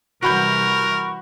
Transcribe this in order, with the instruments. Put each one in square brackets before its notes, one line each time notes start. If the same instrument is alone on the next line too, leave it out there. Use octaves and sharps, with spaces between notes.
[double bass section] C3 E3 G3 [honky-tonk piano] F#4 B5 G6 [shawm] A#4 [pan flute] C#6